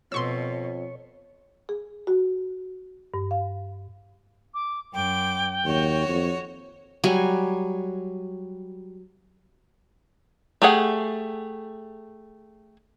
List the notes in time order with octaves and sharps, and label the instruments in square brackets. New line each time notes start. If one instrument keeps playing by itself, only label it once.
[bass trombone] F2 [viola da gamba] B2 [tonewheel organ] C#5 [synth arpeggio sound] C6 C#6 E6
[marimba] G#4
F#4
G2
F5
[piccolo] D6
[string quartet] F#2 D6 [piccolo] G5
[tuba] D#2 [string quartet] F#4 C#5
[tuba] F2
[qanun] F#3 G3 G#5 C#6
[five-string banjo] A3 G4 G#4 F#5